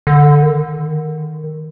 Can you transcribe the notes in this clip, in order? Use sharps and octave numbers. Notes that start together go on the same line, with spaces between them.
D3
D#3